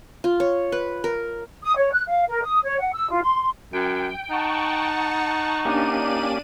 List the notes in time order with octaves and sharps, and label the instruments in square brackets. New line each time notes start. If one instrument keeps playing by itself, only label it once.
[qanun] F4
C#5
B4
A#4
[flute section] D#6
C#5
F#6
F5
A#4
D#6
C#5
F#5
E6
F4
C6
[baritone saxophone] F#2 [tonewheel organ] G5
[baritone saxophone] D#4 [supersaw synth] F#5 A5 C#6
[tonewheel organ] A#3 C#4 G4 [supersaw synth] D4 D5 D#7